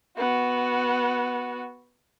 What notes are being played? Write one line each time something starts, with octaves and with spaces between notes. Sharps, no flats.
B3 F#4